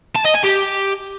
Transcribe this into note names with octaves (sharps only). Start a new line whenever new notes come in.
A5
D#5
G#5
G4